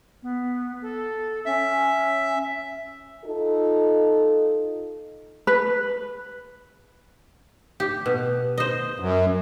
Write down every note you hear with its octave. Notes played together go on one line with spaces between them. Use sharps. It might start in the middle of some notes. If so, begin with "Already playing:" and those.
B3
A4
C#4 E5
D#4 F4 A4
B4
G4
B2
C5 D#5
F#2